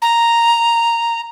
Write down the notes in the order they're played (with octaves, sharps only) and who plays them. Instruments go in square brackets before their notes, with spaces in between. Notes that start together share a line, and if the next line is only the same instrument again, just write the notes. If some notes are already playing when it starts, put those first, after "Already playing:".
[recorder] A#5